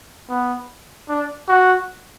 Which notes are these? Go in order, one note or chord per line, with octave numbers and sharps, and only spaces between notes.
B3
D4
F#4